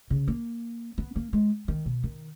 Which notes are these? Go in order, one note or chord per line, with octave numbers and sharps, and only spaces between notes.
C#3
A#3
B3
A#3
G#3
D#3
B2
D#3